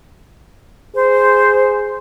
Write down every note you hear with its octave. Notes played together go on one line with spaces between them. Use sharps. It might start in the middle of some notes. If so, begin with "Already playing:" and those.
G#4 C5